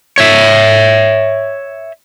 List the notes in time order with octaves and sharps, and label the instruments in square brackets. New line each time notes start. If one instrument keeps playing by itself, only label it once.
[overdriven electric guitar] C#5 E5